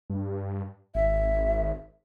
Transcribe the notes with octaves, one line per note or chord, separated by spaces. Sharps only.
G2
G#1 E5